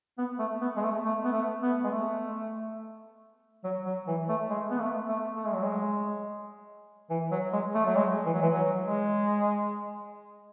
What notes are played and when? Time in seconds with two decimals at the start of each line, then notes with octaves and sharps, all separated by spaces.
0.18 B3
0.39 A3
0.61 B3
0.76 G#3
0.83 A3
1.05 A3
1.24 B3
1.32 A3
1.62 B3
1.84 G#3
1.91 A3
3.64 F#3
3.86 F#3
4.07 E3
4.29 A3
4.50 G#3
4.71 B3
4.80 A3
5.08 A3
5.36 A3
5.46 G#3
5.54 F#3
5.63 G#3
7.10 E3
7.31 F#3
7.52 G#3
7.75 A3
7.85 F#3
7.96 G#3
8.25 E3
8.33 F#3
8.42 E3
8.53 F#3
8.83 G#3